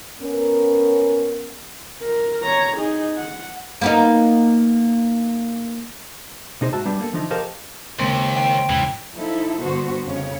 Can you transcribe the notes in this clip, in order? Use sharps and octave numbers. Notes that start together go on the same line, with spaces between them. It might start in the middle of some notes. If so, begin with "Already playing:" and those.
B3 C#4 A#4
A#4
C#5 A#5
D#4 G#4
F#5
A#3 B3 D#4
C3 D#4 G#4 C5
G#2 F#4 E5 A5
G3 B3 D4
A#3 A4
D3 E3 F3 D#4
G4 A4 A#4 C5 D#5 F5
D#2 C#3 G#3 A#3 C4
G5
E2 G#2 C#3 E3
F3 D#4 E4 A4
G2 D3 B3 F#4 C5
F2 C#3 C#4 C#5